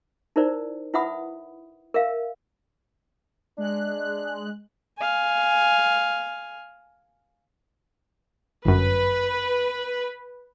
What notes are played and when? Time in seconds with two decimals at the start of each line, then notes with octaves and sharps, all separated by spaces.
0.36 D#4 E4 A#4 C5 D5
0.94 E4 B4 E5 F#5 B5 D#6
1.94 A#4 E5 F5
3.58 G#3 D4 F#6
4.98 F5 G#5
8.65 G1 F#2 B4